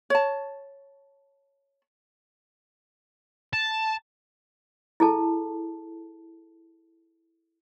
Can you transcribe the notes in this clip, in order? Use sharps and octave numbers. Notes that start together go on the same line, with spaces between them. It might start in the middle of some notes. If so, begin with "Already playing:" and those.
C#5 A5
A5
E4 G#4 A4 A5